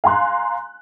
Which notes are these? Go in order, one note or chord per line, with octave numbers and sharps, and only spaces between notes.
F5 G#5 A#5 C6 F#6